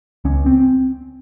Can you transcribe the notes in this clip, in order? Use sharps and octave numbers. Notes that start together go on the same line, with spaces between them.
C#2 C#4
C4